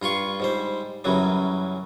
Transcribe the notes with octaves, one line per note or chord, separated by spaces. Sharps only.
G2 F4 C6 C#6
G#2 G3 C5
F#2 C#3 E3 F#3 G3